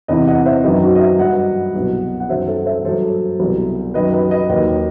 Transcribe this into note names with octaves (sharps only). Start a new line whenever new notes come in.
E2 C3 E3 B4 D#5
D#5 F#5
C5 E5
F#2 D#3 F#3 B4 D#5
D#4 F#4
D#5
C5 E5
G2 F#3 D#5 F#5
C2 B2 F#3
F#5
F#2 D#3 F#3 C5 E5
A4 C5
C5 E5
G2 F#3 A4 C5
C2 B2 F#3
F#2 D#3 F#3 B4 D#5
B4 D#5
B4 D#5
D#2 D#3 F#3 B4 D#5